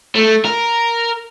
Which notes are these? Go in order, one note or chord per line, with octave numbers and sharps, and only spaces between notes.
A3
A#4